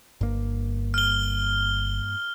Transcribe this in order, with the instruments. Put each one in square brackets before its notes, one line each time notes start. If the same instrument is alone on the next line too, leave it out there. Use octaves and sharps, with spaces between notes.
[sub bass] G1 [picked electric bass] G2 A#3
[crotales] F6 G7